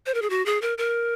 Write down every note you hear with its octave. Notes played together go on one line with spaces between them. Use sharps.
C5
A#4
G#4
F#4
G#4
A#4
A#4